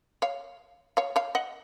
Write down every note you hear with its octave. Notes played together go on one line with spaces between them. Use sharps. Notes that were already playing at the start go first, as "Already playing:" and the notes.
C#5 F5
C#5 F5
C#5 F5
D#5 F#5